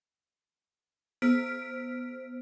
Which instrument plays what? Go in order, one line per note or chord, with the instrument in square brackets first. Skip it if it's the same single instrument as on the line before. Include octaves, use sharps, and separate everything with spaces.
[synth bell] B3 C5 F6 B6 D7